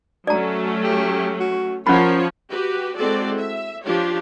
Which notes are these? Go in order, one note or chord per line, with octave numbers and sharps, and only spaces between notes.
F#3 A3 C#4 F#4 D5 A#5
G4
F#4
F3 C#4 A#4 C#5 B5
F#4 G4 B4
G#3 C4 E4 F#4 A4 D5
E5
F3 D4 F4 G4 C#5